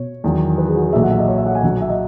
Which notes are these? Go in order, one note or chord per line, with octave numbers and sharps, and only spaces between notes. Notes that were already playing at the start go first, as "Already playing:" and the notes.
Already playing: B2 C#5
E2 D#3 F#3
B4
G#4
F#4
G#4
B1 A#2 F#3 E5
F#5
E5
D#5
C#5
E5
F#5
G#5
B1 B2 F#3 F#5
E5
D#5